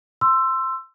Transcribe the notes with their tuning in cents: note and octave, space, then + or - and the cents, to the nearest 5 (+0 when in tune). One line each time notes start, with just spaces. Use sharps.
C6 +0 E6 +20